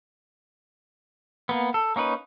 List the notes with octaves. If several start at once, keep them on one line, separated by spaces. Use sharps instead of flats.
A#3 B3
A4
A#3 C#4 D#4 B4